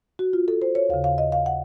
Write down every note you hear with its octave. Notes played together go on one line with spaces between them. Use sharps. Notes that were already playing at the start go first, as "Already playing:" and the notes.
F#4
F4
A4
C5
C#5
D#2 C#3 F5
F5
D#5
F5
F#5